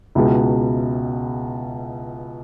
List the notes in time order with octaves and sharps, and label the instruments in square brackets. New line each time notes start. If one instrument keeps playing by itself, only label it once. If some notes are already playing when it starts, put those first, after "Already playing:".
[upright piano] C#2 B2 G#3 E4